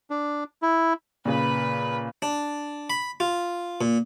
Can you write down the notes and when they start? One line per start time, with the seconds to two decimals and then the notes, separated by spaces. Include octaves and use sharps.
0.10 D4
0.62 E4
1.25 A#2 C#3 B4 B5
2.22 D4
2.90 B5
3.20 F4
3.81 A#2